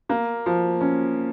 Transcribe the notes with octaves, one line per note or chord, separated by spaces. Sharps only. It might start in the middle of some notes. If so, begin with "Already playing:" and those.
A#3
F3
C#4